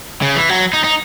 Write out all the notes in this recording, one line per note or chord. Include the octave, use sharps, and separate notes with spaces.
C#3
E3
F#3
D#4
D#4